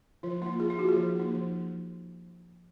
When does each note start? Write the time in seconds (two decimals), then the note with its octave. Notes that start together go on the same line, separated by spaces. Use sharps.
0.23 F3 F4
0.42 A#3 D#4 F4
0.60 F3 G#4
0.70 F4
0.79 D#4 F#4
0.82 A#3
0.89 G#4
0.97 F3
1.15 A#3 D#4
1.34 F3